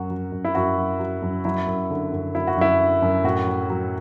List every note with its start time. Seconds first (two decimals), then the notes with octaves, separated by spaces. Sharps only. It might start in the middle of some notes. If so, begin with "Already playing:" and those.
Already playing: F#2 F#3 F#4
0.10 F#3
0.32 F#2
0.45 E4
0.55 F#2 F#4
0.78 F#3
0.99 F#3
1.22 F#2
1.45 F#3 E4
1.67 F#2
1.90 D3
2.12 F#2
2.35 F#3 E4
2.47 F#4
2.57 F#2 E4
2.80 D3
3.02 F#2
3.24 A2 F#4
3.47 F#3
3.70 F#3